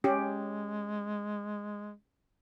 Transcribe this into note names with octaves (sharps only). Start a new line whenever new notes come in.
G#3 C#4 G4